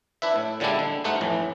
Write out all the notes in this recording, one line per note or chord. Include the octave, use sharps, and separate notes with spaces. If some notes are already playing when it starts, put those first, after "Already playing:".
D4 E4 B4 E5
A2
A#2 D3 G3 G#3 D4 E4
D3
G2 A3 D#4 C5 F#5
F2 A2 E3